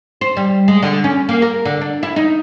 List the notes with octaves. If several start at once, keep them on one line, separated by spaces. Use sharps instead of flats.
C5
G3
G#3
D3
C#4
A#3
A#4
D3
D4
E4
D#4